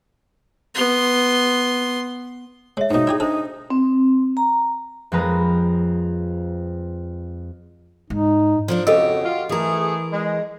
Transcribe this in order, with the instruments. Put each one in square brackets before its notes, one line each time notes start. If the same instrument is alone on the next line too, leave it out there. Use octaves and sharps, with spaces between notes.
[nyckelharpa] B3 C6
[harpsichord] G#3 [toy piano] C#5 E5
[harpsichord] G#2 B2 [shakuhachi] D#4
[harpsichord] E4 G4 G#4 [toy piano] D5
[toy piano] D4 C5 [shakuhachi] D#4 [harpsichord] A4
[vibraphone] C4
A#5
[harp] F2 F3 G#3 B4 A#5 D#6
[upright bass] G#2 [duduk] D#4
[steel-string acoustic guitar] F3 A#3 D4
[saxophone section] F2 C#3 [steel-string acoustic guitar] F#4 G4 [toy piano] A4 D#5 E6
[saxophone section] F4
[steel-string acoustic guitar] E3 A#4 [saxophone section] A3 G#4
[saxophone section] G#3